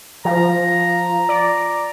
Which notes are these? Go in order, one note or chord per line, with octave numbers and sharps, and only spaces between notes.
F3 A#5
D5